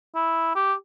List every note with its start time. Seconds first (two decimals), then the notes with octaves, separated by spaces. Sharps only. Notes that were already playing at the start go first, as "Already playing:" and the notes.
0.15 E4
0.55 G4